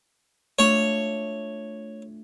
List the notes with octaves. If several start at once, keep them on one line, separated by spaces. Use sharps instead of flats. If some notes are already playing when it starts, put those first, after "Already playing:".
A3 D4 F4 C#5